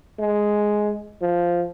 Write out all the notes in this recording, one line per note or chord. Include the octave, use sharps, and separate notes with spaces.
G#3
F3